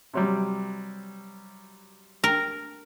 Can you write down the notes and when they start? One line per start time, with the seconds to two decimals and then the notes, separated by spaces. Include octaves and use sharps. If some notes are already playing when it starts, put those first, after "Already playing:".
0.14 C3 F#3 G3
2.24 A#4